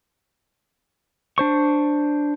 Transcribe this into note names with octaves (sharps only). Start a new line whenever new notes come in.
D4 C5 C#6